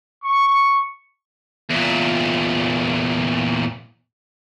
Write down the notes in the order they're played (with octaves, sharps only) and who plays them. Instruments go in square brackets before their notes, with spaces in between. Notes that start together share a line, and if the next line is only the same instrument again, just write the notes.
[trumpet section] C#6
[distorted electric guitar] E2 A#2